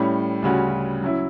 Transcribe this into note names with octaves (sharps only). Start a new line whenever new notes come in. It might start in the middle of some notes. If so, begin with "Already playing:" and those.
Already playing: A2 G3 C#4
D2 C#3 G3 C#4 F#4
F#3 C#4 E4